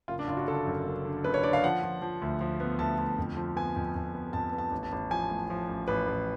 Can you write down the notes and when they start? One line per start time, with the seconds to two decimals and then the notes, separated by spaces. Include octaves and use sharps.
0.08 F#1 F4
0.19 D4
0.27 F#1 F4
0.37 F#4
0.47 D3 A4
0.66 F#2
0.86 F#1
1.05 D3
1.24 F#1 B4
1.34 C#5
1.43 D3 D5
1.53 F5
1.63 F3 F#5
1.83 F3
2.02 F3
2.22 D2
2.41 F3
2.60 B3
2.79 D2 A5
2.99 D2
3.18 F2
3.37 F3
3.56 B3 G#5
3.76 F2
3.95 F2
4.14 B3
4.33 F2 A5
4.53 B3
4.58 A5
4.72 A1
4.83 A5
4.92 A1
5.10 F3 G#5
5.30 A2
5.50 F3
5.69 A1
5.88 A1 B4
6.07 A1